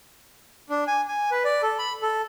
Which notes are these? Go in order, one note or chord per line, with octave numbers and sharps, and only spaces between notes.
D4
G#5
G#5
B4
D5
A4
B5
A4